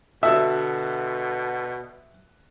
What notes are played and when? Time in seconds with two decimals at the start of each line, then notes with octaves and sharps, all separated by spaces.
0.23 B2 D3 F#4 A4 E5